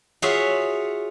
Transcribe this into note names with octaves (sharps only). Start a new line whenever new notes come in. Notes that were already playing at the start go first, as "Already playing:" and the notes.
F4 F#4 G#4 C#5 E5 F5